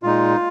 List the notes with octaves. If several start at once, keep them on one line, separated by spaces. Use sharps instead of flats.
A#2 G#3 D#4 F4